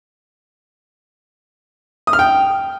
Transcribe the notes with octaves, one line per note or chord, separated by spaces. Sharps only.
D#6
F6
G5